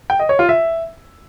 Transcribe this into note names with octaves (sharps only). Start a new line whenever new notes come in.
G5
D#5
C#5
F4
E5